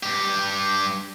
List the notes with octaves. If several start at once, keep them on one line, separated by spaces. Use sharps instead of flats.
G2 G4